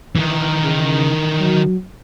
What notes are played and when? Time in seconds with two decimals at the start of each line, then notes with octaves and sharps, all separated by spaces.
0.16 D#3 E3
0.63 C#3
1.39 F#3